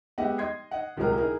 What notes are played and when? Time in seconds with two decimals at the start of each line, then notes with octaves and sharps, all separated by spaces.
0.18 G#3 B3 G4 D#5 E5 F#5
0.38 D#5 C6 G#6 C7
0.71 D#5 F#5
0.97 D#1 C#2 C3 F#3 G#4 A#4
1.17 D#4 E4 G#4 A#4